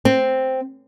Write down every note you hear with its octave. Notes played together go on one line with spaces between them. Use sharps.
C4